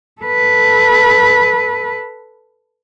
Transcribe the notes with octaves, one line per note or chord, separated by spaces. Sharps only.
A4 B4